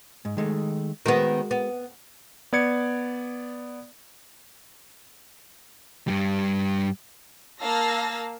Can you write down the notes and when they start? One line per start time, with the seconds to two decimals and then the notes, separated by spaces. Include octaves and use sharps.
0.25 G#2
0.37 D#3 G#3 A3
1.06 D#3 G#3 B3 F#4 A#4
1.51 B3
2.53 B3 D5 G#6 C#7
6.08 G2 G3
7.61 A#3 F5 A5 E6 A#6